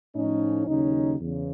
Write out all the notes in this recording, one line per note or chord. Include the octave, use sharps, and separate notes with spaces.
A2 F3 C#4 D#4
D#2 C#3 F#3 C#4 D#4
E2 C#3